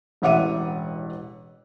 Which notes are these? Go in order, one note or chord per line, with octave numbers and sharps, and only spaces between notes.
E1 A1 E5 F#5 D6 D#7